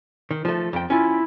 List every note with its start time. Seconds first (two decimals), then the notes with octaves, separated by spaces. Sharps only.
0.31 D#3
0.45 F3 A3
0.73 F2 G5
0.90 C#4 E4 F4